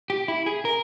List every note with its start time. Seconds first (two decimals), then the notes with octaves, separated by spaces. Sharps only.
0.10 G4
0.28 E4
0.46 G#4
0.65 A#4